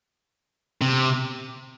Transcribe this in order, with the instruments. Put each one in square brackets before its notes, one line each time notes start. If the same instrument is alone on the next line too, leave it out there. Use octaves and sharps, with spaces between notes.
[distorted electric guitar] C3